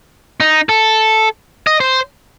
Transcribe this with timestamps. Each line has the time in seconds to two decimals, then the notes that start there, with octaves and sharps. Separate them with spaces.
0.40 D#4
0.69 A4
1.67 D#5
1.80 C5